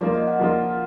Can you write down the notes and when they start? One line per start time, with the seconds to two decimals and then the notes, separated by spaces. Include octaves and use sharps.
0.01 F3 A#3 F4 D5
0.14 D#5
0.27 F#5
0.39 F3 A#3 F4